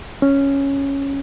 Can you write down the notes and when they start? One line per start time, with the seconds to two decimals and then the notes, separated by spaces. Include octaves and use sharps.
0.22 C#4